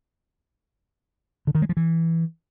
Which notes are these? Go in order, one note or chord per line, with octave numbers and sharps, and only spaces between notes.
D3
D#3
G#3
F3
E3